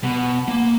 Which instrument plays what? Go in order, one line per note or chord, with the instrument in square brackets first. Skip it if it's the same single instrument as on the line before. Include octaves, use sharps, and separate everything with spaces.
[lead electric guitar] B2
A#3